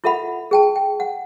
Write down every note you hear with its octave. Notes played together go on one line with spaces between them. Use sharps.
E4 F4 A4 E5 F#5 B5
G#4 G5 A5
G5
F#5